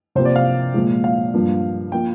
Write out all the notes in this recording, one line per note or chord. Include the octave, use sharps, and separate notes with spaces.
C3 F3 A#3 C5
D5
F5
A#2 F3 G#3
F5
G2 F3 A#3
F3 A#3 G5